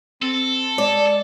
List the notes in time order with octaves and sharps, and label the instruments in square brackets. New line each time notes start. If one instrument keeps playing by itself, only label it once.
[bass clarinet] C4 [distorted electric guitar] A4
[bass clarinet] G#3 [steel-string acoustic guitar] D5